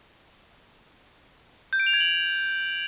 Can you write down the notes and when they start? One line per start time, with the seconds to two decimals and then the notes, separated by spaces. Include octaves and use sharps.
1.73 G6
1.80 D7
1.87 F7
1.93 G#6
2.00 F#7